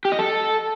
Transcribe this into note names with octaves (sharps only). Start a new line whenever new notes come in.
G4
D#5
A4